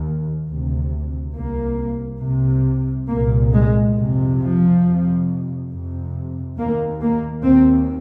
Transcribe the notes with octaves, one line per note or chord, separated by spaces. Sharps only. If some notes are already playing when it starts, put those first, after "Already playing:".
Already playing: D#2
D2 C3
C2 C3 A#3
C2 C3
C2 A#2 A#3
G#3
F2 C3
F3
F2 C3
F2 C3
D#2 A#3
A#3
D#2 C4